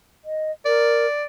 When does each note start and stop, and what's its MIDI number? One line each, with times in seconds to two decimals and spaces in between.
0.25 0.51 75
0.66 1.06 70
0.66 1.25 74